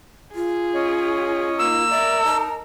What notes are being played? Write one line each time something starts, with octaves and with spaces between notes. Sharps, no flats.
F4 G#4
C#4 C#5 D#5
A#3 D#4 E6
A#4 D5 E5
D#4 A5